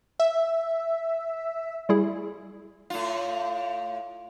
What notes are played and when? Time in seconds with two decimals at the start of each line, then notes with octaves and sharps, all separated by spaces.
0.20 E5
1.89 G3 E4 G#4
2.90 A2 F4